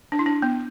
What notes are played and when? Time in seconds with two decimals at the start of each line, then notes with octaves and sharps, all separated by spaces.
0.12 D4
0.19 E4
0.26 D4
0.42 B3